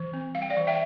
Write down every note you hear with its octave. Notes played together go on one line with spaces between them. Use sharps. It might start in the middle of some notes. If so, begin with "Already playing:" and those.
Already playing: E3
C4
G3 F5
G5
D5 F5
E3
E5 G5